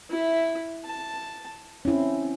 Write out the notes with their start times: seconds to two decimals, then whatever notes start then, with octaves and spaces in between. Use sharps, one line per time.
0.10 E4 E5
0.85 A5
1.85 C4 C#4 E4